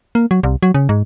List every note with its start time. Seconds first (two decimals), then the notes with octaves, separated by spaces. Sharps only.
0.15 A#3
0.31 F#3
0.43 C2
0.63 F#3
0.74 C#3
0.89 G#2